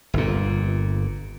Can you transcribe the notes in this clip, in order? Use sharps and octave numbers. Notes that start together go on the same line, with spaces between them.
G1 A#2